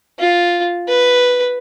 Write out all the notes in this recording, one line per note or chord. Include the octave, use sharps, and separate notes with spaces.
F4
B4